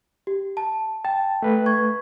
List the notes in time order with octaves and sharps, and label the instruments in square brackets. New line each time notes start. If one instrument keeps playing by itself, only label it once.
[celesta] G4
A5
[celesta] G5 [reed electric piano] A5
[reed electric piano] A3 B4
[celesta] C#6 G#6